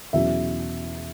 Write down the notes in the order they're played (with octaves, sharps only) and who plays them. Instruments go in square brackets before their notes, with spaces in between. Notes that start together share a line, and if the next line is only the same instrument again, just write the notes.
[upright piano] E2 B2 F#3 C#4 E5